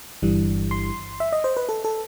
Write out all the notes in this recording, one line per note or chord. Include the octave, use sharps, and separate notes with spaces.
G1 G2 E3 G3
C6
E5
D#5
C5
B4
A4
A4